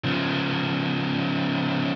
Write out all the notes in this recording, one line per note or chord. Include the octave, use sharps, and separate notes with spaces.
C#3 F3